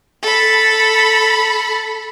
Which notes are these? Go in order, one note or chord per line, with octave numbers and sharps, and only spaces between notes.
A4 B5